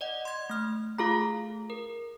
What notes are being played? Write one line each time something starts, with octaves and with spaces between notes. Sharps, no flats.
D5 D#5 F#5
C6 G#6
A3 F6
A3 F4 G#4 A4 F5 A#5
A#4